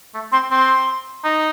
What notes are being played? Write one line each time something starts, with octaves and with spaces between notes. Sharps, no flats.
A3
C4 C6
C4 C6
D#4